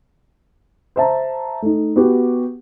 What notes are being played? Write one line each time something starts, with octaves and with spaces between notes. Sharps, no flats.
C5 E5 A5 A#5
A3 D#4
B3 F#4 G4